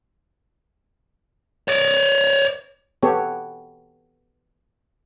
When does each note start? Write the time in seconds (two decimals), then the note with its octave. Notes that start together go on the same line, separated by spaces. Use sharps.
1.68 C#5 D5
3.03 B3 G4 A4 C#5